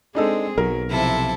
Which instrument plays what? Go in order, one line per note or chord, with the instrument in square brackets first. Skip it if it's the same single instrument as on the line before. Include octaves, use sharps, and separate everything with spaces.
[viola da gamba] G#3 C4 G#4 [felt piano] D4 D#4 A4
[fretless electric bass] B1 [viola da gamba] F#3 [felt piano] A#4
[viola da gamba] C3 F3 [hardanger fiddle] E4 A4